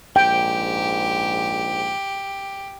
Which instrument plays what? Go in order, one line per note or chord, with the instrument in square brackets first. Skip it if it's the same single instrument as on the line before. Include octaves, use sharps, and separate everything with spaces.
[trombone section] A#1 G#2 [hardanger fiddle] G4 [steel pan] G5